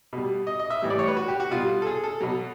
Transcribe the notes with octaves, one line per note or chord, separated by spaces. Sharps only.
B2 G3
D#5
D#5
E5
A2 E3 G3
D5
C#5
B4
F#4
G4
F#4
B2 G3 F4
A4
G#4
A4
B2 F#3